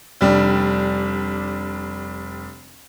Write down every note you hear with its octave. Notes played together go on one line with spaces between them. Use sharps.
F1 G3 D4